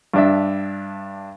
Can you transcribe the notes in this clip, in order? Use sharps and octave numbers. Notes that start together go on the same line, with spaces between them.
G2 D4 E5